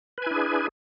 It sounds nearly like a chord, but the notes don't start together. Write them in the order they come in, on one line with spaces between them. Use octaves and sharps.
B4 G#5 E4 D4 G#4